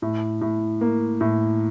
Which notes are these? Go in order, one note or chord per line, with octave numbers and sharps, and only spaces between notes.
A2
A2
A#3
A2